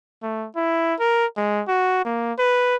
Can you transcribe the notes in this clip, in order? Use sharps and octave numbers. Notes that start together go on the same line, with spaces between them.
A3
E4
A#4
G#3
F#4
A#3
B4